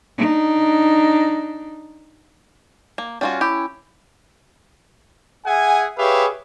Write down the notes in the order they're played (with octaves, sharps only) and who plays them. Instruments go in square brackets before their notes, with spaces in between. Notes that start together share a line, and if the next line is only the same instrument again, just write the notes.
[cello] D4 D#4
[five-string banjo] A#3
[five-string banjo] G3 F4 F#4 [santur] C#4
[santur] E4 [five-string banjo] G4
[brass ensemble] G#4 E5 F#5 G#5
G4 G#4 B4 C#5 E5 F5